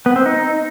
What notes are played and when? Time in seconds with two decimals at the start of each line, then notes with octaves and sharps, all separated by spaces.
0.06 B3
0.16 C4
0.26 D#4